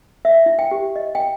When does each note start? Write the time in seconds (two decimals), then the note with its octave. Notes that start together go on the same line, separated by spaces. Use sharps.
0.25 E5
0.46 E4
0.59 G5
0.71 G4
0.96 D#5
1.15 G5